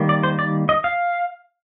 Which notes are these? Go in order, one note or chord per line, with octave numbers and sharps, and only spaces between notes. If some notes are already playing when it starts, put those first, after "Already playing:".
Already playing: D#3 G3 A#3
D5
C5
D5
D#5
F5